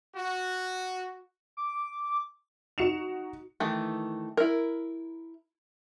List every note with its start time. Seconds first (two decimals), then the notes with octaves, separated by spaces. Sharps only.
0.16 F#4
1.57 D6
2.78 D#4 F#4 C#7 E7 F7
3.60 D#3 E3 A3
4.37 E4 A#4